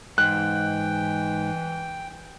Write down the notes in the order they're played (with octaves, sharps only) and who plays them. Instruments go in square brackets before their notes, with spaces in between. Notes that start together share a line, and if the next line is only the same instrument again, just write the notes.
[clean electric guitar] G#2 [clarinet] E3 [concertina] G5 [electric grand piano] F#6